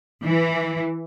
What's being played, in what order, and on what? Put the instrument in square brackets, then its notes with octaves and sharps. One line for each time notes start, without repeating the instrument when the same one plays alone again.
[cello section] E3